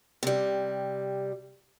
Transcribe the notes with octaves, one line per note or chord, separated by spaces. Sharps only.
C3 G3